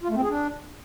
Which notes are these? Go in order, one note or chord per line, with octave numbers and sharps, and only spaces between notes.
F4
A3
C4
G#4
D4